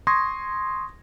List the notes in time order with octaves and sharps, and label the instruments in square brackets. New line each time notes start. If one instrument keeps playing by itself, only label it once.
[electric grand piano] C6 C#6 D#6 G#6 A#6